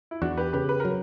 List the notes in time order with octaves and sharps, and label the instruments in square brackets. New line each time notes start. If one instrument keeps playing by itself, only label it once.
[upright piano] E4
[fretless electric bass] E2 [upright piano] D4 F#4
[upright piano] G4 B4
[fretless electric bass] C#3 [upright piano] G4 B4
[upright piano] B4
[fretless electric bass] F#3 [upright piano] A#4